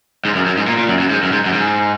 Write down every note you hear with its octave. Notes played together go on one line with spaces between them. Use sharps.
G#2
F#2
F#2
G#2
A#2
A#2
F#2
F#2
G#2
F#2
G#2
F#2
G#2